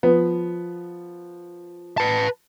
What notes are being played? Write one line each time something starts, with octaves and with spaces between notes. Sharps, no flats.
F3 B3
B4 A5